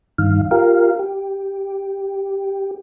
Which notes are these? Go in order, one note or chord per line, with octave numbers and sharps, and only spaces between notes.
G2 D#3 F5
F4 G4 A#4 F5
G4